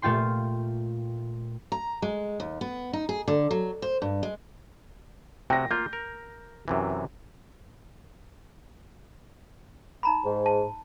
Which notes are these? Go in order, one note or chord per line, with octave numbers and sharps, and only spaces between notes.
A#2 A3 F4 G5 C6
A#5
G#3
D#2
B3
D#4
G#4
D3
F#3
C5
G2
G#3
C3 F#4 G5 A#6
A#3 F4 G6
A#4
F#2 C3 E3
D#4 A#5 B5
G#2
A5